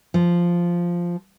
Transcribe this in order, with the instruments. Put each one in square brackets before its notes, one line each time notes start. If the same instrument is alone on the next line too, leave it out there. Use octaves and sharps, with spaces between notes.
[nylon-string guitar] F3